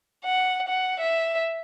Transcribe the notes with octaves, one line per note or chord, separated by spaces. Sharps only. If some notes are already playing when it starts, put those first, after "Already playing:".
F#5
F#5
E5